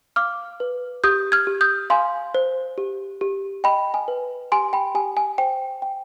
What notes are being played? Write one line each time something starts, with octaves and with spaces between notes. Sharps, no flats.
F5 D6 F6
B4
G4 D#6 G6
F6 G#6
G4
D#6 G6
F5 G#5 C6
C5
G4
G4
D#5 G5 B5
G#5
B4
G4 G#5 C6
G5 B5
G4 G#5
G#5
C5 G5
G5